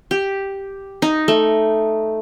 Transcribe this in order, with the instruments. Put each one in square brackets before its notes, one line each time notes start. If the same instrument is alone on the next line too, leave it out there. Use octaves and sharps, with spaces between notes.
[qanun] G4
D#4
A3